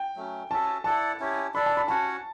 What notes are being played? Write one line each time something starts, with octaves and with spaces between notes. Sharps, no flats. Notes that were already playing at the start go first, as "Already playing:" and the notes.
Already playing: G5
F#3 A3 C#4
C#4 F#4 A4 E5 A5
E4 A4 D5 F#5 A5
C#4 E4 G4 C#5
D4 A4 D5 B5
A5
B5
C#4 F#4 C#5 F#5 A5